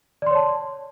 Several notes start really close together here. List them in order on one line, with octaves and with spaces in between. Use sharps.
D5 C6 C#5 A5